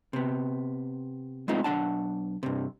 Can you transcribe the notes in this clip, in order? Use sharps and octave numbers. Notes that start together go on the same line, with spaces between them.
C3 B3
G#3 A3 B3 C4 D#4 F4
B1 D4 F#5 A5
G2 C3